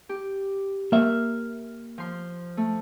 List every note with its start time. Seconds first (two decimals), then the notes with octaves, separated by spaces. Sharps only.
0.09 G4
0.92 A#3 E5 F6
1.98 F3 C6
2.57 A3